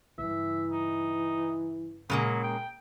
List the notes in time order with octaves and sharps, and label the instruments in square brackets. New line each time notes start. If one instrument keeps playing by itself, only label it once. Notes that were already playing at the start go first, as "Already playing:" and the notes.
[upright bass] G2 C#3 [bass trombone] E3 [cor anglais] E5
[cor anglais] D#4
[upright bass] A#2 F4 [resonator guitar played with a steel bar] C#3 G#3 A#3 [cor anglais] F#3
[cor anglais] G5